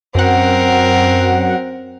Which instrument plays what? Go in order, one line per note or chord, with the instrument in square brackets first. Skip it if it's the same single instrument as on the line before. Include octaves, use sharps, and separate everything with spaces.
[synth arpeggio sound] F#2 F#5 [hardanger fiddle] C4 A#4